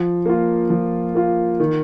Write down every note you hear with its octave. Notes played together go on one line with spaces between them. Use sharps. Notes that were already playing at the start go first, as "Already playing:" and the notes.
Already playing: F3
A#3 F4
F3
A#3 F4
D#3